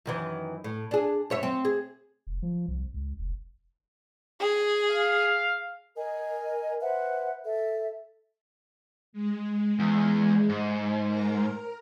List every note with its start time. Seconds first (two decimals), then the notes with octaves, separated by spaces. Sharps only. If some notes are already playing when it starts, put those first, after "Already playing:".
0.06 F#2 D#3 E3
0.64 A2
0.91 D4 G#4
1.30 F#2 C#5 E5
1.43 C4
1.65 G#4
2.27 F1
2.42 F3
2.68 C2
2.94 C#2
3.19 F1
4.40 G#4
4.91 F5
5.97 A#4 D#5 G#5
6.82 B4 C5 E5 F#5
7.45 A4 E5
9.13 G#3
9.79 E2
10.49 G#2
11.07 A#4 A#5